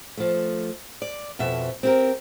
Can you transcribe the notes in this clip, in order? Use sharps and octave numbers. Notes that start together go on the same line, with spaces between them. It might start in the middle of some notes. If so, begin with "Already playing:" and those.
F3 A3
D5
F2 B2 F3 E5
C4 G4 A#4